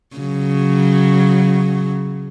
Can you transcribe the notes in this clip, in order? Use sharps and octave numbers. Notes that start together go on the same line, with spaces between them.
C#3 F#3